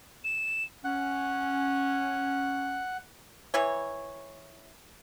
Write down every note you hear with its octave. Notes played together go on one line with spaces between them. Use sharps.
E7
C#4 F#5
E3 E4 C#5